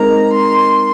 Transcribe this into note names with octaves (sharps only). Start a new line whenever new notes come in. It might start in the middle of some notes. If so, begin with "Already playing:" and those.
Already playing: G#3 C4 D#4 A#4 A#5
C6